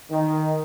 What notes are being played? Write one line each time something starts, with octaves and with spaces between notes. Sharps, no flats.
D#3